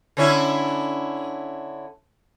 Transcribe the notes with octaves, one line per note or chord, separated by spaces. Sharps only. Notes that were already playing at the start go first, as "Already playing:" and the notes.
D3 C#4 E4